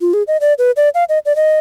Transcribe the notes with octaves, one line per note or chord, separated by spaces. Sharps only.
F4
G#4
D#5
D5
B4
D5
F5
D#5
D5
D#5